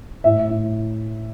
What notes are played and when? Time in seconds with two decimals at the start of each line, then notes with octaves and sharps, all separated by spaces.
0.24 A2 E5
0.49 A2